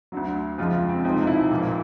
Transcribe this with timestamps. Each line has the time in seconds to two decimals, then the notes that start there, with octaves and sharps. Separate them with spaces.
0.12 D2 D3 F#3 F#4
0.58 F2 C#3 F3 G#3 F4
0.89 C4
1.05 E1 E2 C3 F3 G#3 D#4
1.21 D#4
1.27 E4
1.51 A#1 A#2 F3